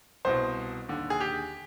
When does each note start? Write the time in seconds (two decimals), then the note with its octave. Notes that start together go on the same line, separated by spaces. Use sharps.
0.25 C2 B2 C5
0.89 D#2 D3
1.10 G#4
1.20 G4